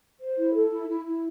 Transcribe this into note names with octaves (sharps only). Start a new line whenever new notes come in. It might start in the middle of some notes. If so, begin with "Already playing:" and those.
C5
E4
A4
E4
E4
E4